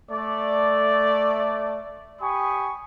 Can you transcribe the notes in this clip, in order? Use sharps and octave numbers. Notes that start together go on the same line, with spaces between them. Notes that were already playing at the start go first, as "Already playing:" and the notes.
A3 D5
G4 G#5 B5 C#6 D#6